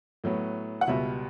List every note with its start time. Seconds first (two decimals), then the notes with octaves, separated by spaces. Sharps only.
0.24 A2 F#3 B3
0.81 F#5
0.87 C#2 B2 G3 B3 E5